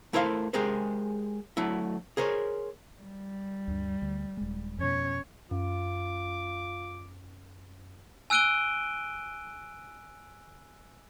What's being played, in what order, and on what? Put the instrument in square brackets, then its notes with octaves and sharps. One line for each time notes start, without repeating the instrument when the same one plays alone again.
[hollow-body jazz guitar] A3 E4 A#4 C5 D5 F5
G#3 G4 G#4 A#4 C5
F#3 A3 E4
G#4 A#4 C5 C#5
[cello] G3
[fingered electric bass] D2 G2
D2
D#1 G#3
[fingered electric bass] F2 B2 [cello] C#4 C#5
[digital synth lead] F#2 [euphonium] F4 [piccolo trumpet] D6
[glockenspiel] G#5 E6 F#6 D7 D#7 G7